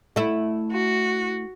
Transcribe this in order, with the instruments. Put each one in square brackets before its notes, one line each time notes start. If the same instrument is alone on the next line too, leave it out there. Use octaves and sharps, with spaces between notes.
[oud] A3 E4
[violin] F#4